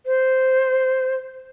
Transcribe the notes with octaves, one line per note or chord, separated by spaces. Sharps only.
C5